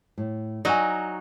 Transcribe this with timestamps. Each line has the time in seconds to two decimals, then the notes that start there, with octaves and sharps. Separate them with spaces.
0.18 A2
0.65 F#3 D#4 D5 G#5